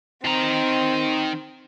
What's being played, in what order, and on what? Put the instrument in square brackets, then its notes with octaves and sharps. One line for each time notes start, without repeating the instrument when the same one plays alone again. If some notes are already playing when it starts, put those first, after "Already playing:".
[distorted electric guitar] D#3 A#5 [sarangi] C4